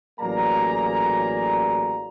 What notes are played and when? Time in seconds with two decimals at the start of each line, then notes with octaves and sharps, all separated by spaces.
0.20 A1 F#3 A#3 G#4 D5 A#5